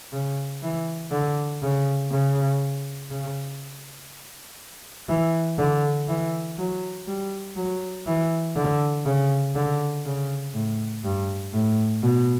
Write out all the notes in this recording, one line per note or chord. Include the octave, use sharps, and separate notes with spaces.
C#3
E3
D3
C#3
C#3
C#3
E3
D3
E3
F#3
G3
F#3
E3
D3
C#3
D3
C#3
A2
G2
A2
B2